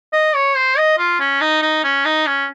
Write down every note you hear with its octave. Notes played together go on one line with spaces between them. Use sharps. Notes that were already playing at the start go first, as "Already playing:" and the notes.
D#5
C#5
C5
D#5
F4
C#4
D#4
D#4
C#4
D#4
C#4